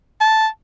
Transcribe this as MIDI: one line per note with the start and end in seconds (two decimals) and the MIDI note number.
0.21 0.47 81